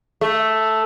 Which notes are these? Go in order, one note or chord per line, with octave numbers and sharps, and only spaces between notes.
A3